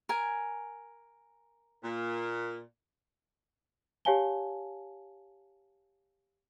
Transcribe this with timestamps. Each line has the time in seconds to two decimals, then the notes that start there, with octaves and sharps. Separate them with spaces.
0.09 A#4 G#5
1.84 A#2
4.05 G4 C#5 F5 G#5 A5 G7